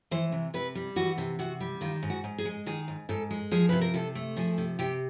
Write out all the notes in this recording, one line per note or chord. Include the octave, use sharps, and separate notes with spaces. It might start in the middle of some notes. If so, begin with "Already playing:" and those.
E3 C5
C3
C3 B4
G3
E3 F#4
C3
C3 F#4
G3
D#3 F4
G#2
F#4
G#2
G#4
G#3
D#3 G#4
G#2
G#2 A4
G#3
F3 G#4
C3 B4
A#4
C3 A4
A3
F3 G#4
C3
C3 G4